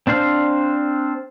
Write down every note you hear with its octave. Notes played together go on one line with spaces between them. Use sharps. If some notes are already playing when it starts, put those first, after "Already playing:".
C4 D4 C5 F5